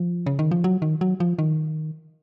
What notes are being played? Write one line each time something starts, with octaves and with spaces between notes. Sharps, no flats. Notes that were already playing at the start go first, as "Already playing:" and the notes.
Already playing: F3
C#3
D#3
F3
F#3
D#3
F#3
F3
D#3